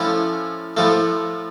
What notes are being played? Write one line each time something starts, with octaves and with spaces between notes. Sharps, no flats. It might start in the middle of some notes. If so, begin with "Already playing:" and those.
Already playing: A2 F3 A3 C#4 E4
A2 F3 A3